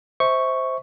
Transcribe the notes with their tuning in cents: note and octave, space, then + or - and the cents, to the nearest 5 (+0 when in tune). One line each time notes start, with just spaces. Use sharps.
C5 +0 E5 -30 C#6 +0